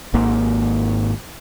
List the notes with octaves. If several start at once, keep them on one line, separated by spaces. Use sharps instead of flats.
G#1 G#2 A#3